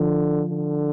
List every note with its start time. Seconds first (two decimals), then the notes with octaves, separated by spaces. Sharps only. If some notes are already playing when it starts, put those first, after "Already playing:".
Already playing: D3 F3
0.49 D3